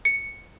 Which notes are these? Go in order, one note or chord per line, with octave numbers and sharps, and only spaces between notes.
C#7